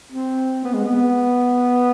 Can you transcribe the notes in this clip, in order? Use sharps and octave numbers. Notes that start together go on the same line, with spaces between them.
C4
B3
G#3
B3